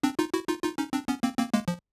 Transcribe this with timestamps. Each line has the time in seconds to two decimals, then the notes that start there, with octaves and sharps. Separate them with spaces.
0.03 C4 D4
0.19 D#4 F4
0.34 E4 F#4
0.48 D#4 F4
0.64 D#4 F4
0.78 C#4 D#4
0.93 C4 D4
1.08 B3 C#4
1.23 A#3 C4
1.38 A#3 C4
1.54 G#3 A#3
1.68 F3